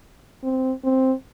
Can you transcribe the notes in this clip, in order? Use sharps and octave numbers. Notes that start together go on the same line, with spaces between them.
C4
C4